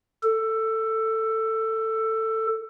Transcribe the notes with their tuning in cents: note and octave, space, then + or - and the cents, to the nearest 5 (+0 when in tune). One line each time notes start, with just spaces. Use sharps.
A4 +15